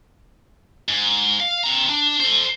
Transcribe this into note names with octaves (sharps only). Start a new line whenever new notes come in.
G#2
F5
C4 A#5
D4
A4 C5